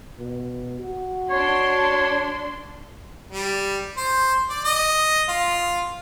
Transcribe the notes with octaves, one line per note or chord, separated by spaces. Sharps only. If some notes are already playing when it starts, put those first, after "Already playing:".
B2
F#4
D4 C#5 C6
G3
C5
D5
D#5
F4